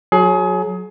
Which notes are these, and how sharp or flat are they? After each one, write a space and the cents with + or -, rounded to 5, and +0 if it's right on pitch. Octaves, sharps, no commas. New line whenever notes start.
F#3 -10 G#4 +30